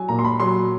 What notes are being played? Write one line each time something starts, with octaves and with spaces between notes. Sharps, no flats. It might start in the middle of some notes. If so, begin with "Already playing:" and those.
Already playing: F#3 G#5
A#2 A#5
C6
B5
F#3 C6